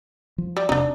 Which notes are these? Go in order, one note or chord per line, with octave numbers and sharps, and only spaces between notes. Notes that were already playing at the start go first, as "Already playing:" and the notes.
F3
G3
E1 C3 C4 D4 D#4